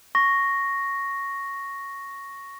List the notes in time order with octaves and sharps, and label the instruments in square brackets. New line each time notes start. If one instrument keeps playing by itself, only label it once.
[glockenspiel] C#6 A#6